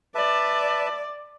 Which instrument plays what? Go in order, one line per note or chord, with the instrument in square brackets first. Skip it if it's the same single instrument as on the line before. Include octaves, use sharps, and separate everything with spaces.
[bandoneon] B4 E5 A5 [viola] D5